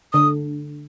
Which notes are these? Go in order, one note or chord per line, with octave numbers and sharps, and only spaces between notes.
D3 D#6